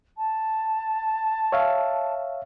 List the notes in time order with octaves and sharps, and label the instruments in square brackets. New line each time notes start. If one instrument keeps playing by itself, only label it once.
[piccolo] A5
[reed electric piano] C#5 E5 F5